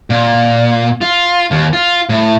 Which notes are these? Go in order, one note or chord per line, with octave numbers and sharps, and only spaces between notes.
A#2
F4
D#2
F4
A2